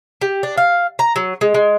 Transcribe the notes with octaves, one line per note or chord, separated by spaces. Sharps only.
G4
D4
F5
A#5
F#3
G#3
G#3